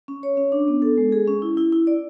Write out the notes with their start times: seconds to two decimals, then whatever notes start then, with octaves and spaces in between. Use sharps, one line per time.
0.08 C#4
0.23 C#5
0.37 C#4
0.52 D4
0.68 B3
0.82 A4
0.98 G#3
1.12 G#4
1.28 C#4
1.42 E4
1.57 E4
1.72 E4
1.87 D5